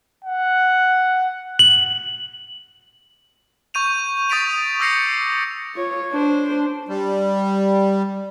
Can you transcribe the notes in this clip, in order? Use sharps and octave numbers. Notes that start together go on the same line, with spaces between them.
F#5
F#7
C#6 G6 D#7 F7
C#6 D#6 A6 B6 D7 F7
D6 E6 G6 A#6 C7 C#7
F4 C#5
D4 C5
G3